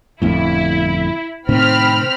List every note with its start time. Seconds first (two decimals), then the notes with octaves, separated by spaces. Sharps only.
0.22 G1 F2 A2 E4
1.49 A2 C3 D#3 C4 B5 F6